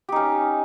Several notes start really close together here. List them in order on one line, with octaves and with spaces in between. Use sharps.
G4 D#4 C#4